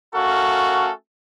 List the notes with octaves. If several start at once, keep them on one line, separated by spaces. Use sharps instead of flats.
A3 C#4 F#4 A4 A#4 F5